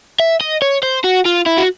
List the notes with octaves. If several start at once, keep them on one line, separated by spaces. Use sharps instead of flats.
E5
D#5
C#5
C5
F#4
F4
E4
F#4